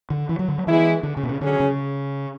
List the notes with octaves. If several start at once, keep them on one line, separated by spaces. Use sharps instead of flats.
D3
E3
F#3
D3
F#3
E3 G#3 B3 E4 G#4
D3
C#3
B2
C#3
D3 F#3 C#4 G#4
C#3